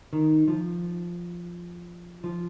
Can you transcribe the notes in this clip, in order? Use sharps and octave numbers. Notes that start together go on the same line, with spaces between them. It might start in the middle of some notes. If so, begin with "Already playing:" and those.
D#3
F3
F3